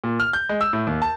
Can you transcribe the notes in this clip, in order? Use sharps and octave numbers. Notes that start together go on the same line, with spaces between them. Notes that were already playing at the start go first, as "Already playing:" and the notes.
A#2
F6
G6
G#3
E6
A2
D#2
A5